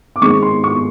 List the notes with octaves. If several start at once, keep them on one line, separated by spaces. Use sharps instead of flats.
D6
D#3 G#3 C4 D#4 C#6
C6
C#6